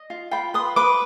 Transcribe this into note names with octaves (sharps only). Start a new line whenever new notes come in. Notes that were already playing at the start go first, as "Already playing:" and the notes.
Already playing: D#5
F4
F4 G5 B5
B4 C6 D#6
B4 B5 D6